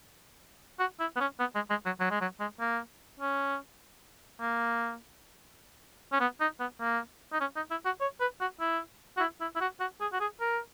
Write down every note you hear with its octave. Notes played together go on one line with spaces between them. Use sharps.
F#4
E4
B3
C#4
B3
G#3
G#3
F#3
F#3
G#3
F#3
G#3
A#3
C#4
A#3
C#4
B3
D#4
B3
A#3
D#4
C#4
D#4
E4
F#4
C#5
B4
F#4
E4
F#4
E4
E4
E4
F#4
F#4
G#4
F#4
G#4
A#4